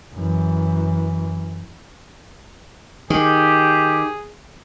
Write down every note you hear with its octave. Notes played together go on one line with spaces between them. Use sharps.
F#2 E3
D#3 G4 G#4